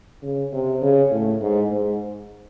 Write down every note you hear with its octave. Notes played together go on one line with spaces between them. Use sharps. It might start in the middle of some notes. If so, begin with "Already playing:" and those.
C#3
C3
C#3
A2
G#2
G#2